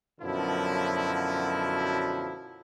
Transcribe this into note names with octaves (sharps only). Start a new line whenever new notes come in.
F#2 B2 D3 F3 F#3 E4